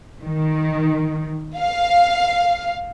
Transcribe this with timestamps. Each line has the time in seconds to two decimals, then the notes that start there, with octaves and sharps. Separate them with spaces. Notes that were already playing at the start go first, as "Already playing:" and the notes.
0.22 D#3
1.58 F5